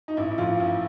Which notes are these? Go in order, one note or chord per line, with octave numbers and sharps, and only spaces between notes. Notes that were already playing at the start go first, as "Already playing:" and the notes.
D#4
A1 E4
E4
A1 F3 F4
F4
A1 E4